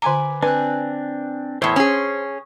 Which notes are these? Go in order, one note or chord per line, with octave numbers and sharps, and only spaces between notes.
D3 B4 G#5 A#5 D6
C4 D4 B4 G#5 F#6
E2 A2 C5 C6 C#6 D#6
C#4 G#4